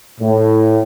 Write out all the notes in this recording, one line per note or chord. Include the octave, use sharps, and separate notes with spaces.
A2